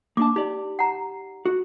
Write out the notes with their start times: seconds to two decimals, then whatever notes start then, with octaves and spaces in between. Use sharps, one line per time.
0.17 A#3 D4 A5 D6
0.36 D#4 G4 D5
0.79 F#5 A#5
1.46 F#4